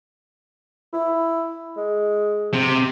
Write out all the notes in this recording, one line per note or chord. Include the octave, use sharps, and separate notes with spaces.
E4
G#3
C3